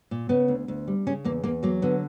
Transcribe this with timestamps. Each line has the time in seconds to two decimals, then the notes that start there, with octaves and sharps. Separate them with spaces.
0.11 A#2
0.29 C#3 B3
0.48 D2
0.68 D2
0.88 G3
1.07 C#3 C#4
1.24 E2 A#3
1.44 E2 A#3
1.63 F#3 A#3
1.82 D3 B3